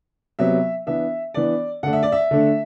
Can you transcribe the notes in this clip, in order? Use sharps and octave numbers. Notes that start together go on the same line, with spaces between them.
C3 F#3 B3 E5
E3 B3 D4 E5
E3 B3 D4 D5
D3 A3 D4 F#5
E5
D5
E5
D3 A3 D4